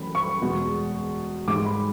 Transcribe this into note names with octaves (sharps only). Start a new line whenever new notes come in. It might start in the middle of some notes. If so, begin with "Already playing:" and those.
Already playing: F#2 E3 A3 B5
C#6
E2 B2 G#3
G#2 G#3 D6
B5